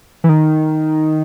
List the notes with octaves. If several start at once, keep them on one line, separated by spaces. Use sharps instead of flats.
E3
D#3